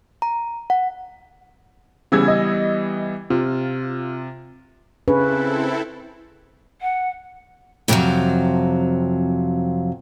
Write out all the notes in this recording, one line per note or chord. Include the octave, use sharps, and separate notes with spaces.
A#5
F#5
C#3 E3 G3 B3 E6 G#6
D#5
C3 F4
C#3 C4 C#4 E4 A4 B4
F#5
F2 A2 C3 D#3 F3 F#3